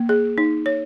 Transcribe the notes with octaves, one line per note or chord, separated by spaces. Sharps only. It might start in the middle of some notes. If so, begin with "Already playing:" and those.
Already playing: A#3
G#4
D#4
C#5